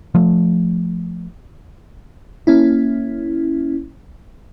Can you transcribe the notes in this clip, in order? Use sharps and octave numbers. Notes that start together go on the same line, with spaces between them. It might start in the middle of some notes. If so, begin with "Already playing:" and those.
F3 A3
A#3 C#4 E4